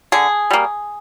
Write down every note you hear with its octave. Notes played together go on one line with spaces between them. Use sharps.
D3 G#4
G3 A#3